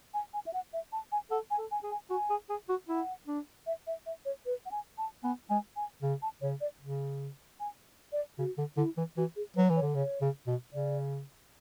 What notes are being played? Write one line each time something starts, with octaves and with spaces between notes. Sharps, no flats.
G#5
G#5
E5
F#5
E5
A5
G#5
A4 F#5
G#5
A4
G#5
G#4
G#5
F#4 G#5
G#4
G#4
F#4
E4 F#5
D4
E5
E5
E5
C#5
B4
F#5
G#5
A5
B3 G#5
G#3 G#5
G#5
C#3
A5
C#3 C#5
D5
C#3
G#5
D5
C#3 F#4
D3
D3 E4
E3
E3 F#4
G#4
F#3 B4
E3
C#5
D3
C#3 C#5
C#3
B2
C#3 D5